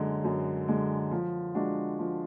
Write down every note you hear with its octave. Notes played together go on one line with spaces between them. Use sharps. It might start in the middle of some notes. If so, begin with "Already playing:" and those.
Already playing: F#2 D3 G#3
F#2
D3 G#3
F3
G#3 D4 F#4
F3